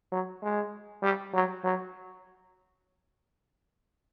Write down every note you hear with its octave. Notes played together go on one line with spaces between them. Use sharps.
F#3
G#3
G3
F#3
F#3